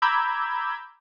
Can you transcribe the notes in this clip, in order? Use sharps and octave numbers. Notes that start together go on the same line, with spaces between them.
A#5 B5 D6 E6 G6 G#6